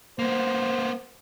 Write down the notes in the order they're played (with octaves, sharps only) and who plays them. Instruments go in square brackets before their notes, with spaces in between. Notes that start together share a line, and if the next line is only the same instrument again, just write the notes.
[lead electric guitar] A#3 B3 [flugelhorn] C5